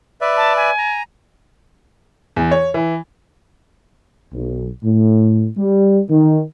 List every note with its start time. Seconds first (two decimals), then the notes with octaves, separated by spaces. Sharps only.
0.21 B4 D5 E5
0.37 A5
0.57 G#5
0.78 A#5
2.36 E2
2.51 C#5
2.74 E3
4.33 B1
4.83 A2
5.57 G3
6.09 D#3